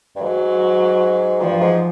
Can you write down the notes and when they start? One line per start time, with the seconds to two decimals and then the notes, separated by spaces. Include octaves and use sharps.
0.16 G2
0.21 G#2 F#3
1.41 G2 F3
1.61 G#2